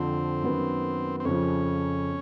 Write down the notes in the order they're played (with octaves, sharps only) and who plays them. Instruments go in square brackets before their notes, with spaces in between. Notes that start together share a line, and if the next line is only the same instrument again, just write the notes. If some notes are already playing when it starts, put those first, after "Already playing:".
Already playing: [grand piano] F2 D3 F3 [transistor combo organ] C4
[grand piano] F#2 D#3 F#3 B3
[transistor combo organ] C4
[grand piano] F2 C#3 F3 [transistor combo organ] C#4